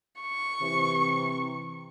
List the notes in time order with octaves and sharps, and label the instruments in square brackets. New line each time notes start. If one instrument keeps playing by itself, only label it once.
[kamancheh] C#6
[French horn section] C3 E3